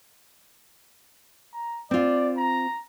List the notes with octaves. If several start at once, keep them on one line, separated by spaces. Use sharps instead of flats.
A#5
C4 F4 D5
A#5